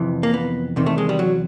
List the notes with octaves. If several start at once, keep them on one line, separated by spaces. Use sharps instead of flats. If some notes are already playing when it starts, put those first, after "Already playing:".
Already playing: F2 C3 E3
A#3
B3
E2 C3 D#3
A3
G#3
G3
F#3